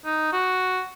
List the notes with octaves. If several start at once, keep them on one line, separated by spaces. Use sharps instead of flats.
D#4
F#4